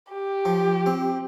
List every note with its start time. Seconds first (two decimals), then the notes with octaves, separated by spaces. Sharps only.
0.11 G4
0.45 F3
0.86 C4